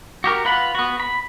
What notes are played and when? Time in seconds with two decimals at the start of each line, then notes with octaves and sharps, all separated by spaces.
0.24 F#4 G4 A#4
0.45 F4 B4 F#5 B5
0.75 B3 F#4
1.00 B5